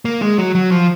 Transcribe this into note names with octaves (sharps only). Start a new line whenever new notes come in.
A#3
G#3
F#3
F#3
F3